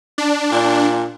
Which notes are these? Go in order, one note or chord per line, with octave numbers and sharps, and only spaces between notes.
D4
A#2